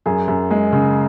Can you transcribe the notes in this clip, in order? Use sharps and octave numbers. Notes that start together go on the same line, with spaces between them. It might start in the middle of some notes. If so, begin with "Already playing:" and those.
F#2 G#4
F#2
G#3
C#3